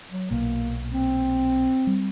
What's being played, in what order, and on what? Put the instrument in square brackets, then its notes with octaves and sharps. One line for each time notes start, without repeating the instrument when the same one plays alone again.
[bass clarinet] F#3
[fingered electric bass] B1 A#2 [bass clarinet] A#3
[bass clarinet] C4
[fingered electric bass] G3